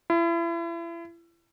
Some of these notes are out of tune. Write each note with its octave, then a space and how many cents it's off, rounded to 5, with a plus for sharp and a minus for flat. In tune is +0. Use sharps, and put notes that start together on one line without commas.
E4 +35